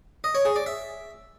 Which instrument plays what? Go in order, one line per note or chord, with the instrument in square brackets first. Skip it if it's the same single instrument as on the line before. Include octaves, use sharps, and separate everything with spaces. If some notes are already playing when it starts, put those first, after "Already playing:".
[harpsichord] D#5
C#5
G#4
D5
E5